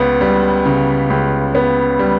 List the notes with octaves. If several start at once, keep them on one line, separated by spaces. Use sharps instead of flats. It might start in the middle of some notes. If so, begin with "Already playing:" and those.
Already playing: C#2 C#3 B3
G3
C#3
C#2
B3
G3